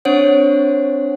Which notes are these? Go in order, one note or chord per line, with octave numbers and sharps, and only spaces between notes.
C4 D4 C5 C#5 F#5